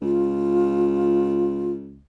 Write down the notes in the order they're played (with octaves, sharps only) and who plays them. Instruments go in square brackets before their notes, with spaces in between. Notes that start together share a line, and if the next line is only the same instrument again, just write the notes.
[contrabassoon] C#2 [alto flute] F4